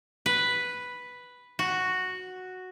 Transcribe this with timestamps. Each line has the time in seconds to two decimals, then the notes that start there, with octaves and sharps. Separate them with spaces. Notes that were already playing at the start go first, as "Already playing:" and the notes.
0.26 B4
1.59 F#4